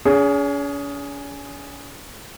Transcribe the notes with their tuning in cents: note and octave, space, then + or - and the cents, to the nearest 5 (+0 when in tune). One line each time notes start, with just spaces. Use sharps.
C#4 +40 G#4 +0